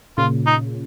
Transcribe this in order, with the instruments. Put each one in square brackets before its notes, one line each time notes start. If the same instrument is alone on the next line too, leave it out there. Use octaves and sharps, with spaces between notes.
[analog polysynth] A#2 C#3 [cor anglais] F4
[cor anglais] D#4